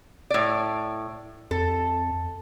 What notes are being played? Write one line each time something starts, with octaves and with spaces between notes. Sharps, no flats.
A2 D5
F2 A4